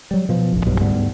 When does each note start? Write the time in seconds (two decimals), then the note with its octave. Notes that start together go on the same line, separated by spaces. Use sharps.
0.11 F#3 G3
0.29 B2 F3
0.53 F1 A#1
0.66 B1 G2 B2 F#3
0.81 D2 G#2 G3 B3